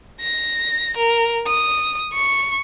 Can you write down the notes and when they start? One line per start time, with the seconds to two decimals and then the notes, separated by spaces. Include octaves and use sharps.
0.20 A#6
0.97 A#4
1.47 D#6
2.13 C#6